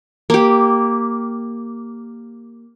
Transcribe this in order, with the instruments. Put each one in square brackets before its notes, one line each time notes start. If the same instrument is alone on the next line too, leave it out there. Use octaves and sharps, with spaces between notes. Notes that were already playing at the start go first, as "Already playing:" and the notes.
[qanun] A#3 G4